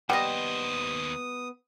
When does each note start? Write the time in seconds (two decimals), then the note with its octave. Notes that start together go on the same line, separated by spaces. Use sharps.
0.10 D#2 G3 B3 C5 D#5 F#5 D#6